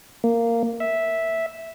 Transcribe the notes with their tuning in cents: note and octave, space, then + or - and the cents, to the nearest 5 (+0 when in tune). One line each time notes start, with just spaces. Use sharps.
A#3 -10
E5 -5